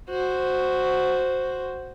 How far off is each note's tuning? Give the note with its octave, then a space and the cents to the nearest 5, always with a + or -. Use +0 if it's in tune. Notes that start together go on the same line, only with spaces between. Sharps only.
F#4 +0 C5 +0